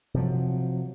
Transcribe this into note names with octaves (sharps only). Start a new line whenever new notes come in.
C3 F3 F#3